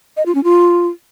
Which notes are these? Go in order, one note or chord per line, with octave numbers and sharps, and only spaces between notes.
D#5
F4
C#4
F4